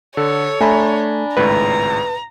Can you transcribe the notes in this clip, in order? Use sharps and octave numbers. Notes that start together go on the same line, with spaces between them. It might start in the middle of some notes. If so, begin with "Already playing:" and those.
D3 A4 C#5
A3 D4 G#5 A#5 B5
G#1 C#2 A2 B4 A#5